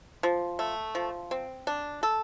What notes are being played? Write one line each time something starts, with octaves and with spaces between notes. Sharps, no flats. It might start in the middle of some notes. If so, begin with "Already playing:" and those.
F3
A3
F3
C4
D4
A4